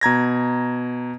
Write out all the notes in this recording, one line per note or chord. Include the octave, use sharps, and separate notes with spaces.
B2 A#5 G#6 A#6